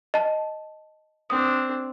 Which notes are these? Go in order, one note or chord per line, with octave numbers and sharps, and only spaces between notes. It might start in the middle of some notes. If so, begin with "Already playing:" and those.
D#5 A5
C4 D4 D#6